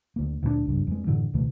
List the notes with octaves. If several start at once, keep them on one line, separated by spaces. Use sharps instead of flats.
D2 A#3
D2 A#2 G3 D4
F#1 C#2 G2
F2 G#3
F#2 A2 D3 E3
C#2 B2 D#3 A3